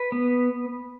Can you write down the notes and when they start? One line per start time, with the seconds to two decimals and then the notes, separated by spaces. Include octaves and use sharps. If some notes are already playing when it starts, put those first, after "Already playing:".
Already playing: B4
0.12 B3